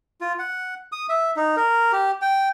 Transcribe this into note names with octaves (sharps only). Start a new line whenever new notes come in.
F4
F#5
D#6
E5
D#4
A#4
G4
G5